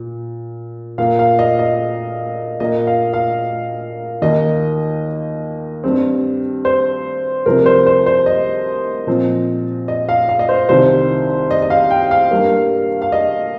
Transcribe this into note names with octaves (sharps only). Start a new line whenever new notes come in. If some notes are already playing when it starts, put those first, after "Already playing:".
Already playing: A#2
A#2 A#3 F5
F5
D#5
D#5
A#2 A#3 D#5
F5
F5
D#2 D#3 A#3 D#5
G2 G3 C4
C5
C2 C3 F3 C4 A#4
C5
C5
C5
D#5
A#2 F3 C4
D#5
F5
F5
D#5
C5
C2 C3 D#3 C4 C5
D#5
D#5
F5
G5
F5
G2 G3 A#3
F5
D#5